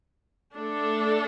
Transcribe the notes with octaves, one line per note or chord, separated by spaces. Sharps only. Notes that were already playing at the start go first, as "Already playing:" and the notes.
A3 D4 A4